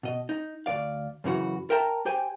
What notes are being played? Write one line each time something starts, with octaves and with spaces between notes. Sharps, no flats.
B2 D#5
D#4
D2 B2 D5 F5
F#2 C#3 E3 F#4
A#4 E5 G5 A5 A#5
G4 C5 G5 G#5